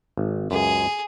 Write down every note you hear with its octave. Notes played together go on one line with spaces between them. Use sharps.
G#1
C#2 F#2 G#4